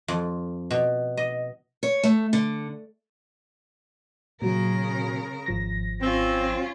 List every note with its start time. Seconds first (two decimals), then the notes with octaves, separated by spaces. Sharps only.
0.08 F2
0.71 B2
1.17 D#5
1.83 C#5
2.03 A3
2.33 D3
4.42 A#2 C#3 F#3 A#4
5.46 G#1 F3 A#6
6.02 C4 C#4 F4